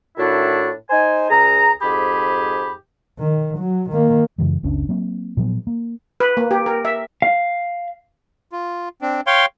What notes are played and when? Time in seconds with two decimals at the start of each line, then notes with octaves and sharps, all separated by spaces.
0.18 A2 D#3 D4 E4 F#4
0.90 D#4 C5 G#5
1.30 C#2 G#4 A#5
1.81 F2 G#2 G4 G#4 B5
3.19 D#3
3.58 F#3
3.90 D#3 A#3
4.38 F#2 C#3 E3 G#3
4.63 F#1 C#2 C#4 D4
4.89 F#3 A#3 C4
5.37 A#2 F3 F#3 B3
5.67 A#3
6.20 B4
6.37 A#3
6.51 G4
6.66 A#4
6.85 E5
7.22 F5
8.52 F4
9.01 C4 D4
9.27 C#5 F5 G5 C6